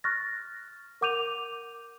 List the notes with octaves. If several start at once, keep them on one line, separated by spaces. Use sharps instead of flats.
C#6 F6 F#6 A6 A#6
A#4 F#5 D6 G6 D#7 F7